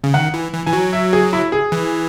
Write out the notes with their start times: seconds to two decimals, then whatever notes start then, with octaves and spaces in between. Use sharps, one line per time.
0.04 C#3
0.14 D#3 F#5
0.34 E3
0.54 E3
0.66 E3 G#5
0.73 F#3
0.93 E5
1.13 G#4
1.33 E4
1.52 G#4
1.72 E3